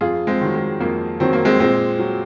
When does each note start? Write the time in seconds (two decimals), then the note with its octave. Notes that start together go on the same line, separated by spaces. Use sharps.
0.01 F2 F4 G#4
0.27 G#3 C4
0.41 D#3 F#3
0.55 G#3
0.81 F2 A#3
1.20 D#3 F#3 C4
1.33 A#3
1.45 G#3 C4
1.60 A#2 G#3 C4
1.99 F#3